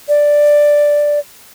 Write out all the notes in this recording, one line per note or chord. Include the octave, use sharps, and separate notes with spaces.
D5